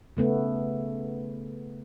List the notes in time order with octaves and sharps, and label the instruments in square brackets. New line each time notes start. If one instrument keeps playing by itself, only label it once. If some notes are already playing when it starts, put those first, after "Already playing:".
[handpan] C#3 A3 B3